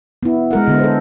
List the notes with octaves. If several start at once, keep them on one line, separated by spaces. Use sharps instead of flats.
B3 E4
G#3 A#4 F#5
D3 B3
A4 C5